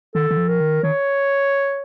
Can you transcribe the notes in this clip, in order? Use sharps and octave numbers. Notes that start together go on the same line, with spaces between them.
D#3 A4
D#3
F3
A#4
D#3
D#3 C#5